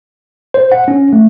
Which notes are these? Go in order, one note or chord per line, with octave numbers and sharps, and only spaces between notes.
C5
F#5
C#4
A3